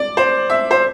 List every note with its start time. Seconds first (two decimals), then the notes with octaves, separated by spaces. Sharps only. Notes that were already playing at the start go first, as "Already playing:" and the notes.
Already playing: D5
0.17 C5
0.50 E5
0.71 C5